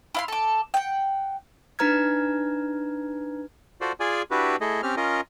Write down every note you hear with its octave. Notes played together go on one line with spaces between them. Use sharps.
E4 F5 C6
A4 D6
F#5 G5
D4 D#4 B4 A#5 F6 G#6
F4 F#4 A4 C5 D5
F4 G#4 D5 G#5
D4 E4 F#4 G4 B4
A3 E4 G#4 A4 D#5
C4 C#4 G4 F6
C#4 F4 A#4 D#5